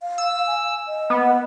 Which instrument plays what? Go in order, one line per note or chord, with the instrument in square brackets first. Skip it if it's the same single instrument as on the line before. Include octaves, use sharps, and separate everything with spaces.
[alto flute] F5
[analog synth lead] E6
[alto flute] G#5
D#5
[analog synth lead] B3